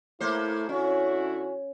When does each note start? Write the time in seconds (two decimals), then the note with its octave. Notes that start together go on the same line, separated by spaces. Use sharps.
0.20 A3 A#3 E4 C5
0.69 D3 C#4 E4 F#4